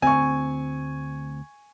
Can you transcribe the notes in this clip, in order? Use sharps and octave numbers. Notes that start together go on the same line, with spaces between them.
D2 C4 G#5 C#6